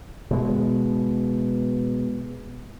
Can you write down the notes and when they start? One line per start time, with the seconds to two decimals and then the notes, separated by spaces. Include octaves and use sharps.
0.31 B2 G#3